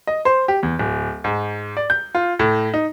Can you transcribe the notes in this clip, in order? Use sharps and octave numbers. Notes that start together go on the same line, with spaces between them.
D#5
C5
G4
E2
D1
G#2
D5
G6
F4
A2
D#4